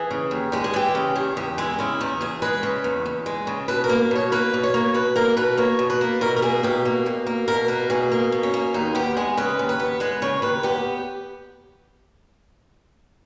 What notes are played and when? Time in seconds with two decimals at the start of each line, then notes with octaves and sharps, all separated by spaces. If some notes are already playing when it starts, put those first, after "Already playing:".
Already playing: E3 G#4
0.11 C#3
0.31 D#2
0.52 G#3 G4
0.64 G#4
0.74 E3 G4
0.95 C#3
1.15 E2 G#4
1.37 E2 G4
1.58 G#3 E4
1.79 C#3 E4
2.01 E2 D#4
2.21 E2 G#4
2.42 G#3 B4
2.63 C#3
2.84 E2
3.06 E2
3.26 G#3
3.47 C#3
3.68 B2 B4
3.84 A#4
3.89 A#3
4.11 B2 C#5
4.32 A#3 B4
4.54 B2
4.63 C#5
4.74 A#3
4.94 B2 B4
5.16 A#3 A#4
5.37 B2 B4
5.57 A#3 C#5
5.79 B2
5.90 B4
6.01 A#3
6.21 B2 A#4
6.36 A#4
6.42 A#3 G#4
6.63 B2 G4
6.85 A#3
7.06 B2
7.26 A#3
7.48 B2 A#4
7.68 A#3 B4
7.90 B2 G#4
8.12 A#3
8.32 B2
8.43 C#4
8.54 A#3
8.74 D#2 D#4
8.95 B3 G4
9.17 G#3 G#4
9.37 C#3 B4
9.59 D#2
9.69 B4
9.80 B3
10.00 G#3 B4
10.22 C#3 C#5
10.42 D#2 B4
10.63 B3 G4